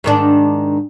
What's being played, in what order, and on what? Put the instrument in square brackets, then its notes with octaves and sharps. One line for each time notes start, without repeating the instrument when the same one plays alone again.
[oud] G#2 D#3 D4